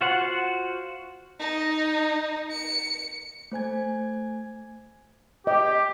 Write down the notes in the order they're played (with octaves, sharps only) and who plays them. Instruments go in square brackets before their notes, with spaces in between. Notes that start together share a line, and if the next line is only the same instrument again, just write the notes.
[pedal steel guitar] F4 F#4 C5 F#5
[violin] D#4
C#7
[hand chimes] A3 C5 G#5 G#6
[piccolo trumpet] G4 [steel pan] D#5